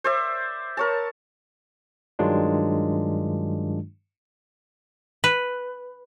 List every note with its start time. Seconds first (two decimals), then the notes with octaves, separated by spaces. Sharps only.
0.04 C5 D5 E5
0.77 A#4 C#5 A5
2.19 G2 D#3 F#3 G#3 D4 F4
5.24 B4